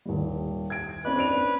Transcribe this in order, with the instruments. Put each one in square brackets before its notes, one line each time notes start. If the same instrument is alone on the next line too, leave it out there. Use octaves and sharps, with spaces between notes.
[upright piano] D#1 G3
G#6 D7
[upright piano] C4 C#4 D5 [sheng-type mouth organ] B4 F#6
[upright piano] D4 D7 F7